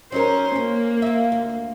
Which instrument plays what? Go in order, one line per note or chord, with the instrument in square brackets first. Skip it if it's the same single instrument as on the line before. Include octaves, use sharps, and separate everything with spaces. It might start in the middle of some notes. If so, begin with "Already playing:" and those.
[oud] F#3 D#4 A#4 [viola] C#4 C5
[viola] A#3 [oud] C#4
[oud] F4 E5
D2